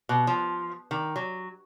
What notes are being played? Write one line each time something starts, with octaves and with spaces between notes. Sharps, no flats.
B2
F3
D#3
F#3